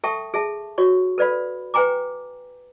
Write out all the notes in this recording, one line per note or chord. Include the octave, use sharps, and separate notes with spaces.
A4 E5 G5 A5 C#6 D#6
G#4 E5 A5
F#4 C#5 C#6
A4 B4 D5 F5 B5
B4 G5 G#5 A#5 D6